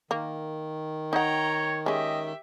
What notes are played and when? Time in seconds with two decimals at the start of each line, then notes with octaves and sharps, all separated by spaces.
0.11 D#3 A#3
1.13 D#4 C#5 F#5 G5 A#5
1.86 G#3 C#4 G4 D#5 E5